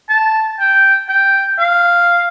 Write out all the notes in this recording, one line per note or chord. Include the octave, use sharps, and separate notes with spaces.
A5
G5
G5
F5